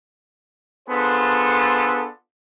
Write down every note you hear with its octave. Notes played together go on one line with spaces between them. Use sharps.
B3 D4 F4 G#4 A4 C5